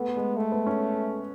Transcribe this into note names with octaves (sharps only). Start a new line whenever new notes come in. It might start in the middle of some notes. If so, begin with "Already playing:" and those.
Already playing: A3 B3
G#3
A3
B3
C#4